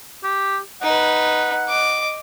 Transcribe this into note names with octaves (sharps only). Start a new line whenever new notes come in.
G4
D#4 B4 F#5
D#5 D6